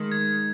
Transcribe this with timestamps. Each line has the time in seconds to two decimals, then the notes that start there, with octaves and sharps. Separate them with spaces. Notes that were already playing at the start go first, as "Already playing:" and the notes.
Already playing: D#3 G#3
0.12 G#6